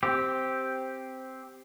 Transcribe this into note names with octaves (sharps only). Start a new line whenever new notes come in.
C4 G4